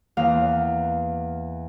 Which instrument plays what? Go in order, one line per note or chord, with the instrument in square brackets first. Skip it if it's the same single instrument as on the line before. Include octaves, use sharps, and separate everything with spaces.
[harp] E2 A#3 B3 F5